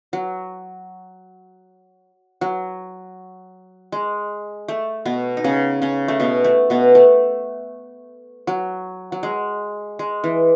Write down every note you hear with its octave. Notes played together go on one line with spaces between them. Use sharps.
F#3
F#3
G#3
A3
B2 B3
D#4
C#3 C#4
C#3 C#4
A3
B2 B3
A3
B2 B3
A3
F#3
F#3
G#3
G#3
E3